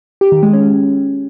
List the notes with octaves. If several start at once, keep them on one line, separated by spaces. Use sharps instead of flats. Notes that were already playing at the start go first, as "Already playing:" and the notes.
G4
D#3
G#3
C#4